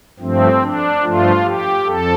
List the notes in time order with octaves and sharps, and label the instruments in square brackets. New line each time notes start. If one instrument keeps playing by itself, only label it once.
[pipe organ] G2 F3 A3 C4
D4
G2 F3 A3 F4
G4
F2 A4